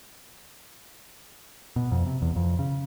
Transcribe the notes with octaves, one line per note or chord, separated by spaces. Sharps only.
B2
F2
C3
E2
F2
C#3